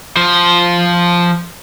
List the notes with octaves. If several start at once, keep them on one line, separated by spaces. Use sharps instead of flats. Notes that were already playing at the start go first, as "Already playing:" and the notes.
F3 C5